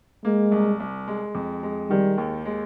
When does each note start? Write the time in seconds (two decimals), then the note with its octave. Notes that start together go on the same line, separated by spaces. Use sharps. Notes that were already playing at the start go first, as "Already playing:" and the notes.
0.25 G#3 A#3
0.52 C2
0.80 C2
1.08 G#3
1.35 F2
1.63 G#3
1.90 D#3 G3
2.18 D#2
2.45 G#3